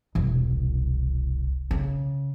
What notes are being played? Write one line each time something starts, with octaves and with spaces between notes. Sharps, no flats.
E1 C2
C#3